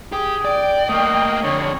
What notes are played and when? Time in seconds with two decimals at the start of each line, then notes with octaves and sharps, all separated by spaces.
0.12 G4 G#4
0.45 D5 G5
0.89 A3 A#3 D#5
1.44 F2 D3 C#5